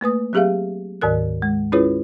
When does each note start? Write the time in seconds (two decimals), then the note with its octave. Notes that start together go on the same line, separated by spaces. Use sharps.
0.01 A3 A#3 B4 D#6
0.33 F#3 C4 G4 G#4 E5 F5
1.01 D2 G#2 D#3 A#4 F#6
1.42 G#3
1.72 C#4 E4 F4 G#4 B4 C#5